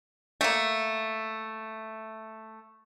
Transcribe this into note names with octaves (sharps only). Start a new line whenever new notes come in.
A3 A#3